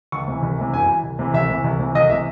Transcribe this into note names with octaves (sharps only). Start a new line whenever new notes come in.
C#2 C#6
C3 E3
C2
C3 E3
F#2 G#5
E3
C2
C3 E3
C2 E5
C3 E3
C2
C3 E3
C2 D#5
C3 E3 E5